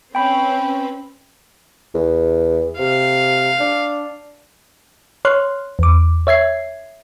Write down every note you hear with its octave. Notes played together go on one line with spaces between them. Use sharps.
C4 C#4 B4 G5 B5
E2
C3 F5
D4
C#5 C6 F6 F#6
E2 D6
C#5 E5 G#6 C7